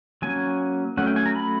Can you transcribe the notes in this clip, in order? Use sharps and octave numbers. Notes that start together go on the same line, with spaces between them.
F#3 A#3 C#4 G#5
F#3 A3 C#4 F#5
G5
G#5
A#5
B5